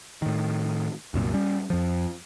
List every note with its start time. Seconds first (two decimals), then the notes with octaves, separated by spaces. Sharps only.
0.22 A2 D#3
1.14 C2 F#2 A#2
1.34 G3 C#4
1.70 F2 F3